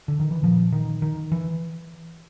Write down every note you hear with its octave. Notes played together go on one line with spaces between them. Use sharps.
D3
D#3
E3
A#2 F3
D#3
D#3
E3